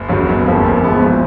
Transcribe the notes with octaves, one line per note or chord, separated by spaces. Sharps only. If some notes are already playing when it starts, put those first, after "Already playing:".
Already playing: F#1
F#2 C#3 F#3
G1
F2 C#3 F3 A#3
A#1
A#2 F3 G#3 B3
G#1